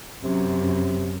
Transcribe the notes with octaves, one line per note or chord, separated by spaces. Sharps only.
F#2 C3